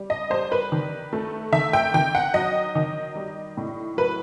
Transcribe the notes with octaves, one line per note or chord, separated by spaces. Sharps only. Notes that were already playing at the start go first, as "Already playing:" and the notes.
Already playing: G3
D#5
G3 C5
B4
D#3
A3
D#3 E5
G5
D#3 G5
F#5
F#3 D#5
D#3
G3
A2
F#3 B4